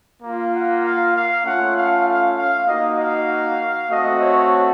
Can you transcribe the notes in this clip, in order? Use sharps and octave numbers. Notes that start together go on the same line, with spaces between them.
A#3 F4
F#5
F5
F5
A3 C#4 F4 F#5
F5
F5
F5
A#3 D#4 F#4 D#5
F5
A3 C4 F#4 D#5
C#5